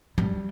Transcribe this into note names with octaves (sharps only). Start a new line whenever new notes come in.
G3